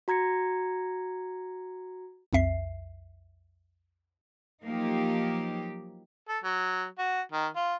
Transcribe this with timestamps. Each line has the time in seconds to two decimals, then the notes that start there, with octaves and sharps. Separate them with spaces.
0.08 F#4 A#5 G#6 A#6 C#7
2.33 B1 F2 E5 C7
4.64 F3 F#3 A#3 D#4 G4
6.29 A4
6.44 F#3
6.99 F#4
7.32 D#3
7.56 F4